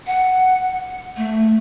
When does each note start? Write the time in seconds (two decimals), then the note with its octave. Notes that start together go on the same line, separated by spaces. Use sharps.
0.07 F#5
1.17 A3